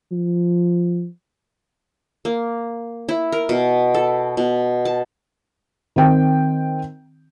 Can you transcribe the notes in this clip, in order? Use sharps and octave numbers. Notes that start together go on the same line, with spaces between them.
F3
A#3
E4
A#4
B2
A4
B2
A5
D#3 C4 G5